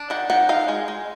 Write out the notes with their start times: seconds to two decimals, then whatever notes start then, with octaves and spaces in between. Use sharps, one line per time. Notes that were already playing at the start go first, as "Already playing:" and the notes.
Already playing: D4
0.10 D#3 F#5
0.30 D#3 F#5
0.49 D#4 F5
0.68 G#3
0.88 G#3